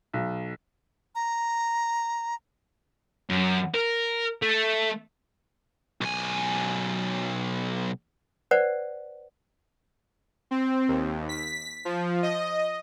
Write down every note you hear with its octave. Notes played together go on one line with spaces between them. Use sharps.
B1
A#5
F#2
A#4
A3
B1 G#5
B4 C5 D5 F#5
C4
D#2
B6
F3
D#5